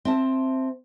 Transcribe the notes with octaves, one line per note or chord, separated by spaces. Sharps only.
C4 E5 A5